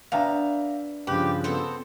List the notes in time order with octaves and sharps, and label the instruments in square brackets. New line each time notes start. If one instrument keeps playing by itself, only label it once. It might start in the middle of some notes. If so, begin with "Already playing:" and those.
[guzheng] B3 D4 [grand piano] E5 G5 A#5 [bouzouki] F5
[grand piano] G2 C#3 F3 [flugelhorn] G4 [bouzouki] B4
[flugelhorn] B3 [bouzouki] C4 A4 C5